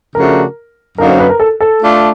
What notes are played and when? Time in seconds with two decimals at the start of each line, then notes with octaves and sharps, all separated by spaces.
0.15 C#3 F3 A3 D4 F#4 A#4
0.98 F#2 D3 F#3 A#3 D#4 A#4
1.08 C5
1.19 B4
1.29 A#4
1.40 A4
1.60 A4
1.82 A3 D4 F4